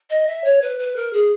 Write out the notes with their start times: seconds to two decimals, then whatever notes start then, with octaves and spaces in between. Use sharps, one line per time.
0.10 D#5
0.27 E5
0.44 C#5
0.61 B4
0.79 B4
0.96 A#4
1.13 G#4